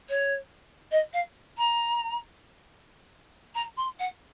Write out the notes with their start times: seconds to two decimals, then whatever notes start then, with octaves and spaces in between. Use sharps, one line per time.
0.09 C#5
0.91 D#5
1.13 F5
1.57 A#5
3.54 A#5
3.77 C6
3.99 F#5